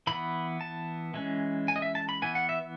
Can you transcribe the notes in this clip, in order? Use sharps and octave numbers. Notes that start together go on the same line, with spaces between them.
E3 B3 B5
A5
E3 G#3 C#4
G#5
D#5
E5
A5
B5
E3 B3 G#5
F#5
E5